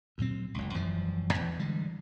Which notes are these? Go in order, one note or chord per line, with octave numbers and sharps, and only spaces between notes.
D2 A#2 F#3 C4
F#1 C#2
E1 F#2 E3 F3
E2
D3 E3 G3 G#3